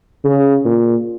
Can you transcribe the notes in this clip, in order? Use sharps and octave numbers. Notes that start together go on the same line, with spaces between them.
C#3
A#2